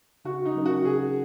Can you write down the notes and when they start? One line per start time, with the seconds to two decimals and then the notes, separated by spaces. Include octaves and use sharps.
0.25 C#3 F#4
0.45 D#4
0.55 F#3 C#4 A#4
0.66 F#4
0.85 C#3 G#4